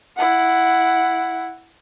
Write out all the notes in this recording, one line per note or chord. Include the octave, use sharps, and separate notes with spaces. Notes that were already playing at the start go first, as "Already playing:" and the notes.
E4 F#5